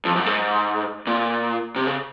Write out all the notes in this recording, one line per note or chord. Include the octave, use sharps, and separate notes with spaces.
F2
F#2
G#2
A#2
C3
C#3